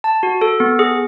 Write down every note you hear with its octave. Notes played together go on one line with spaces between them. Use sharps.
A5
F#4
A4
B3
G#4